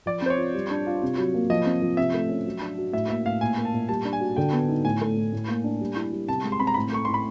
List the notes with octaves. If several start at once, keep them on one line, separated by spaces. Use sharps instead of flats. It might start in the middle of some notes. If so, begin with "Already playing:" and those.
F3 D5
C4 C5
C#5
F4
G3
D4
F4
C3
F#3
A#3
F3 D#5
C4
F3
C3 E5
A3
C#4
F#3
D4
F#4
A2 E5
A#3 E5
A2 F5
A#2 G#5
A#3
A5
A#2
G3 A5
D4
G#5
F#4
D3 G5
B3
D#4
A2 G#5
A3
A2
A2
A#3
D4
G3
E4
G3
C3 A5
G#3
C6
C4 B5
A#5
A2 B5
A3 C#6
A2 C6
B5